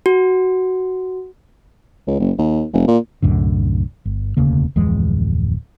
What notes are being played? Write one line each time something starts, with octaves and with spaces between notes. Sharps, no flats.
F#4
C#2
F#1
D#2
F1
A#2
C2 F#2 A2 D3
G1
E1 D2 C#3 A#3
D1 F2 E3 G#3